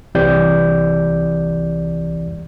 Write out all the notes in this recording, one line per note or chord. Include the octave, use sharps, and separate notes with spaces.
C2 E3 C4 G4 D5 G6